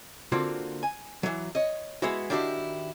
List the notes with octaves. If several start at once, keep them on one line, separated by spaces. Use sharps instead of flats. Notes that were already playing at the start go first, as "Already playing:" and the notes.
D3 A#3 C4 F4 F#4
G#5
E3 F#3
C#5 D#5
G#3 B3 E4 F#4
D#3 D4 E4 F#4 G4